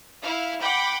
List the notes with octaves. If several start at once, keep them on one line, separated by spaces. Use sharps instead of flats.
E4 F5
F#5 G5 B5 D6 G6